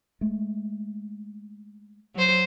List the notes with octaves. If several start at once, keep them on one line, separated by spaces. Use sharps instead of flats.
G#3 A3
F#3 C5